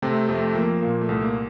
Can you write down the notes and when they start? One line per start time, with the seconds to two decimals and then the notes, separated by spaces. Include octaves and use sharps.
0.02 C3 A3 C4
0.29 F2 A3 C4
0.55 F3 A#3
0.81 A#2 A#3
1.01 A3
1.09 C2
1.21 A#3